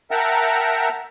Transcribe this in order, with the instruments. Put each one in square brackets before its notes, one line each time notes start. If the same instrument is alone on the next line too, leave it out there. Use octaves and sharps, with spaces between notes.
[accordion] A#4 E5 F#5 G5 A5 A#5